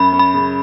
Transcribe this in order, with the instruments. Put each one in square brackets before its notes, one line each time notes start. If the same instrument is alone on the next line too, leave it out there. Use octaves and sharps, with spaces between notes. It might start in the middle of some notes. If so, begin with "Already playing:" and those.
Already playing: [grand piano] F#2 [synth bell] B5
[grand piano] C#4
[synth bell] B5
[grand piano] C#3